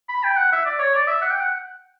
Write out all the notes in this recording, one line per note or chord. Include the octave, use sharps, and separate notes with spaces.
B5
G5
F#5
E5
D5
C#5
D5
E5
F#5
G5
F#5